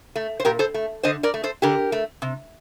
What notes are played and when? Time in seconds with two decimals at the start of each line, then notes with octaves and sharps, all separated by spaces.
0.16 A3
0.40 C5
0.45 A#2 G4 A#4
0.59 A4 C5
0.74 A3
1.03 D3 C5 D#5
1.23 A#4 D5
1.34 A3
1.43 A4 C5
1.62 D3 G4 A#4
1.92 A3
2.22 C3